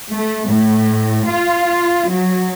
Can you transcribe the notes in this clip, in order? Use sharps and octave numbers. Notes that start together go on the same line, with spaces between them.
A3
A2
F4
F#3